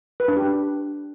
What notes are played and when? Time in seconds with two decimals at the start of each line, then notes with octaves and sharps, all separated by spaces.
0.20 B4
0.28 D4
0.37 G4